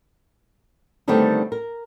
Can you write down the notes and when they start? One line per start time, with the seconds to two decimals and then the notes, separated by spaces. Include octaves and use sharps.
1.08 D3 D#3 G3 A3 B3 C4
1.52 A#4